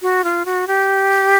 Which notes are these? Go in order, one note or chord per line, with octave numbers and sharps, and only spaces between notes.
F#4
F4
F#4
G4